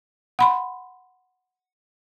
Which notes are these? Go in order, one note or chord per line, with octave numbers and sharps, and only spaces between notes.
F#5 B5 C6